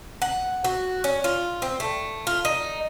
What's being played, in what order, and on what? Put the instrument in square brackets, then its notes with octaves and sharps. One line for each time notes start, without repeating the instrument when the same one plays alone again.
[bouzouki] F#5
F#4
C#4
F4
C4
A3
F4
D#4